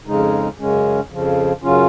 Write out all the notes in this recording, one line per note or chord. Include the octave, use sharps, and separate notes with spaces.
F2 C#3 G#3 D#4
F#2 C#3 G#3 C#4
F2 C#3 F3
F#2 C#3 F#3 C#4 F4